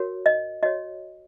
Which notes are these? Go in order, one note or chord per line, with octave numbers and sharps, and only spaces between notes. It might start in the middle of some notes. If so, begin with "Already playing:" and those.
Already playing: F#4 A#4 C#5
D#5
F#4 C#5 D#5